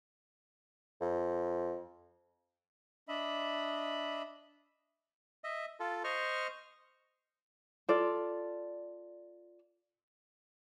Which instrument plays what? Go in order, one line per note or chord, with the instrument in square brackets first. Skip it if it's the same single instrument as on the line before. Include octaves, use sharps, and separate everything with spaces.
[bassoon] F2
[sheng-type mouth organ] D4 D#5 E5 B5
[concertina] D#5 E5
F4 A4
C5 D#5 C#6 F6
[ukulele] F4 A4 D5